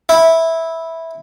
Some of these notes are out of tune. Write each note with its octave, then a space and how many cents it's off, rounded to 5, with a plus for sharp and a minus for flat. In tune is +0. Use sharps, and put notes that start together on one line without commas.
E4 -10